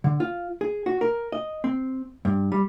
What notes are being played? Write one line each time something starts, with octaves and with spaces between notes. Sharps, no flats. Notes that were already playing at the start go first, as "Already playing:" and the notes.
D3
F4
G#4
F#4
A#4
D#5
C4
G2
G3